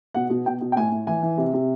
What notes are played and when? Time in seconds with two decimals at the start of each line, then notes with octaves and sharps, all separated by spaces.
0.14 B2 F#5
0.30 B2
0.46 B2 G5
0.61 B2
0.72 G5
0.76 A2 G#5
0.92 A2
1.07 E3 G#5
1.22 E3
1.38 C3
1.54 C3